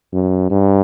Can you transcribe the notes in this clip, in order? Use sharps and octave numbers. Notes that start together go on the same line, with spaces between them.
F#2
G2